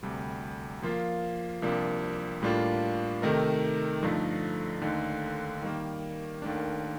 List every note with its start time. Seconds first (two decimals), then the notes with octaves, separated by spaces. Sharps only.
0.03 D2 C3 G3
0.82 F3 A#3 F4
1.62 C2 C3 F3 A#3 D4
2.42 A2 G3 A#3 D4 F4
3.22 C3 D#3 A3 D#4 A#4
4.03 G2 D3 F3 A3 D#4
4.81 D#2 D3 A3 D#4
5.62 D#3 G3 A#3
6.42 D#2 D#3 A3 D4